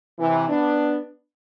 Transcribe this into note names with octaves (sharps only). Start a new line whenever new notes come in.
C3 E3
B3 D4